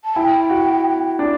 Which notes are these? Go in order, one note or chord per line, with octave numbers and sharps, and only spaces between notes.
A5
E4 G5
F#4
D4